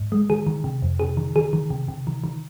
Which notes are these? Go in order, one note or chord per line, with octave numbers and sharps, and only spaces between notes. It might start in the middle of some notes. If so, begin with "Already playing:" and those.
Already playing: G#2
G#3
D#3 G#4
D#3
C3
F2
C3 G#4
D#3
D#3 G#4
D#3
C3
C3
D#3
D#3